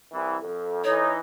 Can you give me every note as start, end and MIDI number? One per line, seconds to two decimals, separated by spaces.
0.12 0.36 36
0.12 0.36 52
0.43 0.84 41
0.43 1.03 69
0.84 1.18 52
0.84 1.18 63
0.84 1.12 73